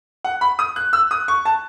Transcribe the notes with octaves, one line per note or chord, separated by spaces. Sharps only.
F#5
B5
D#6
F#6
E6
D#6
C#6
A5